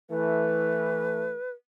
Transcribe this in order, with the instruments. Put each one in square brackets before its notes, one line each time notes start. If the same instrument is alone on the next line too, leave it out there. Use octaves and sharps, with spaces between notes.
[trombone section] E3 A3 [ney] B4